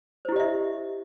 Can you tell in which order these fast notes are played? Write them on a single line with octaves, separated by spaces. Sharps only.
C5 E4 G4 D#5 E5